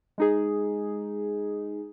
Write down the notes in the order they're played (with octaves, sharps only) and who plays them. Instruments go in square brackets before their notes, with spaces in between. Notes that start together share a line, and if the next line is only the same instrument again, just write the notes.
[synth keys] G#3 D#4 G#4